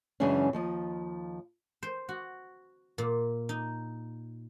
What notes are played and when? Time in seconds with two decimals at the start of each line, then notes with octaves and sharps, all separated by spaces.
0.20 F#2 C#3 E3 G#3 C#4 D4
0.53 D#2 F3 D#5
1.83 C5
2.09 F#4
2.98 A#2
3.49 D#4